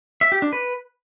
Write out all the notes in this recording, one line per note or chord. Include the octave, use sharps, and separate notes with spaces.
E5
G4
D4
B4